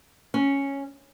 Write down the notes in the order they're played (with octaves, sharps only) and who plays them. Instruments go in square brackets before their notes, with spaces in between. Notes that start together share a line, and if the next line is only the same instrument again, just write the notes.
[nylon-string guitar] C#4